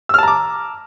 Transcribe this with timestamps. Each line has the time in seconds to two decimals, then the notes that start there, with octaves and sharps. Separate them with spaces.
0.09 E6
0.14 F6
0.18 A5
0.23 A#5
0.28 D6